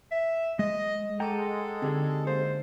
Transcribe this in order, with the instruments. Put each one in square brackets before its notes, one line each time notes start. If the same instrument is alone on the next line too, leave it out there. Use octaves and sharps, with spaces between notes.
[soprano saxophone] E5
[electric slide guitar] G#3 [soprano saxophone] D#5
[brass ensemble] G#3 [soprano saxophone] A4 [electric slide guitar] F#5 G5 A#5 [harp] A5 D6 D#7
[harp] D3 D#4 [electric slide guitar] C4 G4 G#4
[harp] A#3 A#4 [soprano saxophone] C5